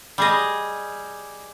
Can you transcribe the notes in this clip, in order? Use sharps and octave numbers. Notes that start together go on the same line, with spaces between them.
G3 G#4 D#5